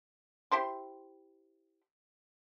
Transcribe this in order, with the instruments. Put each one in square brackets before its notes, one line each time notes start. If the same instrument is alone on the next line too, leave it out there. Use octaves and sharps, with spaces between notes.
[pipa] E4 G4 C5 C6